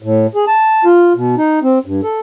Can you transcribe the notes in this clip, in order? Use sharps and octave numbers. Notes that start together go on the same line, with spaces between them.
A2
G#4
A5
F4
B2
D#4
C4
G2
A4